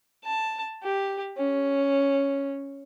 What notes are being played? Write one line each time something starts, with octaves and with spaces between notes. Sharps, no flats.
A5
G4
C#4